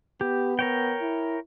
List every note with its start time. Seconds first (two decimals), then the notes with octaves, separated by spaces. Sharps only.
0.21 B3 G4
0.59 A#4 C#5 G5
1.01 E4